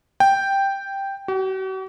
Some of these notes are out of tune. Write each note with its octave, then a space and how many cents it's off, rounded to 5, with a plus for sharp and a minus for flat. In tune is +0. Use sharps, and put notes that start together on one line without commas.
G5 +0
F#4 +45